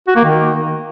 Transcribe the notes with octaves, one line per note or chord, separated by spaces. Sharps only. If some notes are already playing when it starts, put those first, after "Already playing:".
F#4
A#3
D#3